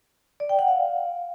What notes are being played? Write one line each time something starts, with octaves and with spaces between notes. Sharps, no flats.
D5
G5
F#5
F5